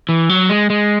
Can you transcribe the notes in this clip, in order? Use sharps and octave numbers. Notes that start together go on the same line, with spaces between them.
E3
F#3
G#3
G#3